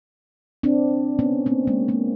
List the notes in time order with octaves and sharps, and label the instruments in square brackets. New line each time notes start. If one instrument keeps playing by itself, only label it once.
[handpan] C4 D4
B3 C#4
A#3 C4
G#3 A#3
G#3 A#3